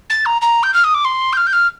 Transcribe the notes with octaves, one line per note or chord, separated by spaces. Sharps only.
A6
A#5
A#5
G6
F6
D#6
D6
C6
G6
F6
G6
F6